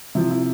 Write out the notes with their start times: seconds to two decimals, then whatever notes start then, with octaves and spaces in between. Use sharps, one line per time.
0.15 C3 F3 E4
0.31 E4